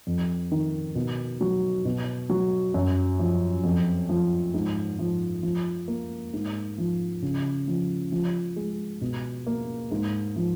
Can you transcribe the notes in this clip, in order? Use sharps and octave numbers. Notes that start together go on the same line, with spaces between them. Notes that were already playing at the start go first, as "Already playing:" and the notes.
F2
D#3
B2
F#3
B2
F#3
F#2
F3
F2
F3
G#2
F3
F3
A#3
G#2
F3
C#3
F3
F3
G#3
B2
A#3
G#2
F3